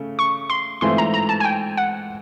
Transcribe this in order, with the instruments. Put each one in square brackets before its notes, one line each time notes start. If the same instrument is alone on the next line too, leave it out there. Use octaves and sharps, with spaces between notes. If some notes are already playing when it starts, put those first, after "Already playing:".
Already playing: [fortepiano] C#3 A3
[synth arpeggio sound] C#6
C6
[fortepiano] G#2 E3 A3 C4 F4 [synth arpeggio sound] C6
[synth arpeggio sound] A#5
A#5
A5
G#5
G5
F#5